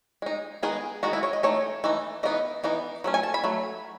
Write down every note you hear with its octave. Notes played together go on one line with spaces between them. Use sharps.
G#3 D#4
D#3 G#3 B3 D#4 G#4
D#3 G#3 B3 D#4 F#4
E4
C#5
D#5
E3 A3 D#4 C#5
E3 A3 D#4
E3 B3 D#4 D#5
E3 B3 D#4
F#3 A3 C#4
G#5
A5
B5
F#3 A3